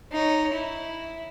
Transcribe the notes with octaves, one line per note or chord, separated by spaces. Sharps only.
D#4 C#5
E4